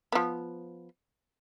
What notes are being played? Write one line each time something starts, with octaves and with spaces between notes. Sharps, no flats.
F3 B3